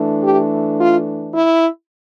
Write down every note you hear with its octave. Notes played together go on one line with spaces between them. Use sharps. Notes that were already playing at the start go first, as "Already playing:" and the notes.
Already playing: E3 A3 D4
G4
F4
E4